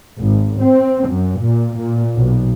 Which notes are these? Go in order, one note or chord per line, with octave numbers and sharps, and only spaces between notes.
G#1
C4
F#2
A#2
A#2
B1